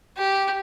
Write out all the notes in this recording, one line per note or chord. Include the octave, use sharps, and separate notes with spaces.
G4